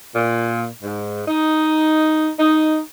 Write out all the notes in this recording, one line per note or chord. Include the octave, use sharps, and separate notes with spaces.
A#2
G#2
D#4
D#4